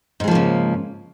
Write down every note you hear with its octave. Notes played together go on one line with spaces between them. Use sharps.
G#2 C#3 F3 G#3 A#3